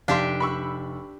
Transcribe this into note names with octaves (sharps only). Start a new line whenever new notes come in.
F1 D4 G4 E5 F5 C6
B5 C#6 E6